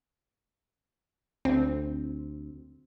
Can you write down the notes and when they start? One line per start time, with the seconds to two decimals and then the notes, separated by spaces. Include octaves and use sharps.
1.45 D2 C4